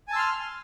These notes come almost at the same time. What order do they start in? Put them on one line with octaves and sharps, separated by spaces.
G#5 A5 E6 C6 F6